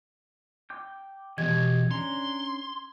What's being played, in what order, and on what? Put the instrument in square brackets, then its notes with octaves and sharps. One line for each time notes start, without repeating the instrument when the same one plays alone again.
[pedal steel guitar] G5 D6 G6
[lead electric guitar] E2 B2 [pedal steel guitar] F#4 G4 D#5 [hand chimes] G#6
[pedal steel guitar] C#4 D4 A#5 [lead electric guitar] C6